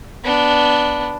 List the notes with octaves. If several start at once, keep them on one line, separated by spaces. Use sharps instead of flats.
B3 D4